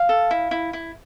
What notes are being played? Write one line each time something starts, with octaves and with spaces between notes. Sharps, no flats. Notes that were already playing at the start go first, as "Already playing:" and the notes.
Already playing: F5
A4
E4
E4
E4